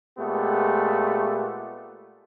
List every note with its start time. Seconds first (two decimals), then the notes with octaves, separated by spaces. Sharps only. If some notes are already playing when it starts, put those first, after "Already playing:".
0.19 A#2 G#3 A3 B3 G4